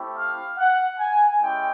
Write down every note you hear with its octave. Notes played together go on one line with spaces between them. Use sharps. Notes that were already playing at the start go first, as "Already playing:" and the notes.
Already playing: A3 C4 E4 G4
F5
F#5
G#5
G#3 C#4 E4 G4 G5